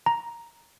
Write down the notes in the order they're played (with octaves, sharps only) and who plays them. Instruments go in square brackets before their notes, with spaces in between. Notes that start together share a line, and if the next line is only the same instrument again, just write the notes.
[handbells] A#5